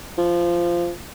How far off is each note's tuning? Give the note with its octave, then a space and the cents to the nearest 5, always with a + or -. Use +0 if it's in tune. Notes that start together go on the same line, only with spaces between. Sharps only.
F3 -15